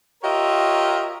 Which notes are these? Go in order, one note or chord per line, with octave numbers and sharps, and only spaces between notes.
F4 G4 A#4 C#5 D#5 E5